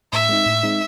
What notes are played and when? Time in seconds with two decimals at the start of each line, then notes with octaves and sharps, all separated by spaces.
0.13 A2 E5
0.29 G#3 C4 D#4
0.46 A2
0.63 G#3 C4 D#4